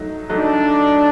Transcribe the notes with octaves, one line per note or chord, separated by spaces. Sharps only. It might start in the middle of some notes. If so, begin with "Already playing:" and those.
Already playing: F#3 A3 D#4
F#3 A3 D4 D#4